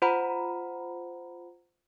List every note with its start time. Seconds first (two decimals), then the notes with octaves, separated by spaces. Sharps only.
0.02 F4 C5 F#5 A#5 B5